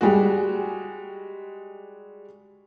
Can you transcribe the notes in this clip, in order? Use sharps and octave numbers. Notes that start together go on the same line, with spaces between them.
G3 G#3 F#4